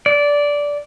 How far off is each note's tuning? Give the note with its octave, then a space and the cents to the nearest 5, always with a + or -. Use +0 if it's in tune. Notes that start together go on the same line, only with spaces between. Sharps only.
D5 -15